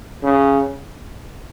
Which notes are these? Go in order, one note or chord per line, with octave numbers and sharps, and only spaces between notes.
C#3